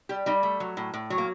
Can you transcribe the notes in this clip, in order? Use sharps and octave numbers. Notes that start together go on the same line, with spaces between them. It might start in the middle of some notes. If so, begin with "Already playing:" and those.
G3 G4
G3 D#4
A3
F#3
A2
A2
F#3
A#3